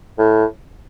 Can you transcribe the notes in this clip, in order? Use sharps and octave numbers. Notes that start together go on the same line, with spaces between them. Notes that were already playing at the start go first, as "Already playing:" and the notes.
A2